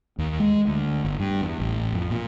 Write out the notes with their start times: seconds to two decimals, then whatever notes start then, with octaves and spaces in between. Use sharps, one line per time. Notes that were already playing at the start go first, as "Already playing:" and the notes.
0.18 D#2
0.40 G#3
0.67 D2
1.05 G1
1.20 G2
1.41 E2
1.60 A1
1.93 F2
2.10 A#2